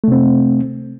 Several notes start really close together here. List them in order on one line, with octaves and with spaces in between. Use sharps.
A3 C3 C4